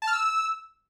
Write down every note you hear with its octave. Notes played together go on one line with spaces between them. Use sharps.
A5
F6
E6